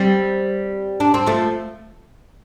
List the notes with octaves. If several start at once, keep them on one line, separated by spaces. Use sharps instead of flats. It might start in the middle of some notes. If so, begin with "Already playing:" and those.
Already playing: G3 C4
D4
C4
F3 A3